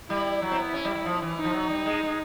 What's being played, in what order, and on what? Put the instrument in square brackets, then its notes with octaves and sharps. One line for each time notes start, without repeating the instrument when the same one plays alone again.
[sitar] G3 [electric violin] E4
[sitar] F#3
C4
B3
C#4
G3
G3
F3
E3
[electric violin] D#4
[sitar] F3
F#3
G3
G#3
G#3